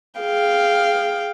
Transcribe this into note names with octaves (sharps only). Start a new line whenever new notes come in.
G#4 F5 G5